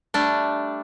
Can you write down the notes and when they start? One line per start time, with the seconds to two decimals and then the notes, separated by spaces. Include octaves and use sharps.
0.14 G3 A3 D4